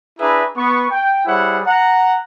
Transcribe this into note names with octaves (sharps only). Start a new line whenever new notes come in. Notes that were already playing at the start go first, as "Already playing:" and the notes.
D4 E4 G#4 B4 E5 A#5
B3 C#6
G5
G3 E4 G#4 C5 C#5 F#5
F#5 A#5